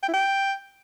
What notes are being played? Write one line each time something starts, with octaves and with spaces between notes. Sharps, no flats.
G5
E4
G5